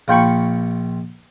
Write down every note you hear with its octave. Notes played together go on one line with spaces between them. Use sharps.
A#1 F4 G5 B5 C#6